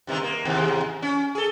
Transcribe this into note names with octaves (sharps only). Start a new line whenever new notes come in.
G2 C3 D#3
A#3
D#2 G#2 C3
C#4
G#4 A4